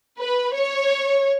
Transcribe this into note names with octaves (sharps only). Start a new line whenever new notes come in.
B4
C#5